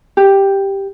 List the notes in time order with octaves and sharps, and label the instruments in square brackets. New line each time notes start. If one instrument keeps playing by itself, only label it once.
[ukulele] G4